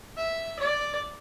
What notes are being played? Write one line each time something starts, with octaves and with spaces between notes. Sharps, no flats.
E5
D5